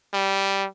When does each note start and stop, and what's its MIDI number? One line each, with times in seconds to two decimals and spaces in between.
0.13 0.66 55